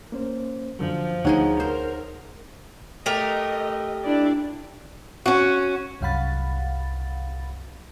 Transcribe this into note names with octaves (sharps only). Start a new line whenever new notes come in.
A#3 C#4 C5
F#2 D3 F3 F#3
D2 D#4 G#4 C#5 D#5 F#5
A#4 C5
A3 G4 A#4 D#5
D4 E4 D5
C#4 F#4
C2 F#2 F5 F#5 B5 A6